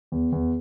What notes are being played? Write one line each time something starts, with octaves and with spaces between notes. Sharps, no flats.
E2
E2